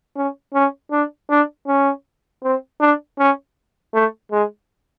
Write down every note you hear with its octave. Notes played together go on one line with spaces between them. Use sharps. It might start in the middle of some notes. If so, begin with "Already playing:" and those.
C#4
C#4
D4
D4
C#4
C4
D4
C#4
A3
G#3